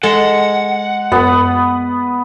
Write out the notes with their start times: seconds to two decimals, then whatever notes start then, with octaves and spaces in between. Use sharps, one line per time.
0.03 G#3 A4 F#5
1.12 F#2 B3